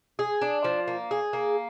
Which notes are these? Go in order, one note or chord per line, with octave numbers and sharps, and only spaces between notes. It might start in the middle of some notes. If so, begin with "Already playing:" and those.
G#4
D4
F3
A#3
G#4
A#3